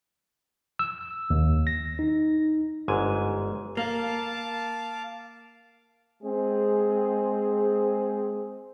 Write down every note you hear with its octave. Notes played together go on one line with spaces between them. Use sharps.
E6
D#2
A#6
D#4
G1 G#2 G#5
A#3 F5 A5 D6
G#3 C4 G#4 C5